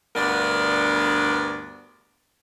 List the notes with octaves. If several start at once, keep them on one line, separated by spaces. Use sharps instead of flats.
D2 G2 B3 D4 A#4 D5